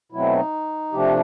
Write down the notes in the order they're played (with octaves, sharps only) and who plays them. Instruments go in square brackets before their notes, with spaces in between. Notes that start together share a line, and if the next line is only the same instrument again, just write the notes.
[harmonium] B2 F#3 A3 C4 E4
D#4
C3 F3 A3 D4 G4